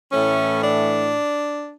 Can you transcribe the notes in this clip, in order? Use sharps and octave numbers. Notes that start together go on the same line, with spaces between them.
A2 E3 A3 C#4
D4